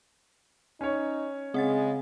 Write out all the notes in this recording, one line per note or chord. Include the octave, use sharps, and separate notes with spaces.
C#4 D#4 C#5
C#3 G#3 C4 F#5 A6